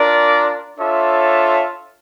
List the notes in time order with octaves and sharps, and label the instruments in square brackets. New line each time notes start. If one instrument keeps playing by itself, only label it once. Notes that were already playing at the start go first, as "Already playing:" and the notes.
Already playing: [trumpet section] D4 F4 A#4 D5
D4 F4 A4 C#5 E5